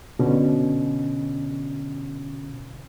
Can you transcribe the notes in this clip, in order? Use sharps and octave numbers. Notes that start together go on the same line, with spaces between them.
B2 D3 C#4